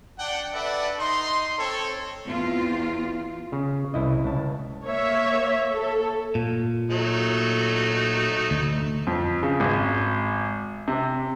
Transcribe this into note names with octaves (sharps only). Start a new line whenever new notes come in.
D4 F#5 G5
D4 A4 B4 D5 E5 F#5
D#4 C6
C4 A4 C#5
E2 C4 F4
C#3
C2 E4 D#5
C#2 A5
A#3 C#5 E5
A4
A#2
F#3 A3 D#4
D2
F2
C#3
G#1
C3